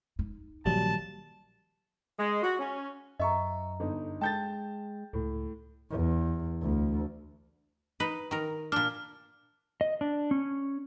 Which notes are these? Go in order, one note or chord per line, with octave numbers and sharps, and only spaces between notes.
D#4
A#1 D#3 F#3 G3 A5
G#3
F#4
C#4
F#2 D#5 E5 A#5 C#6
G1 D#4
G#3 G5 A5 G6 A6
C#2 A2
E2
D2
D#4 B4
D#3 A#4
A#2 D4 F6
D#5
D4
C#4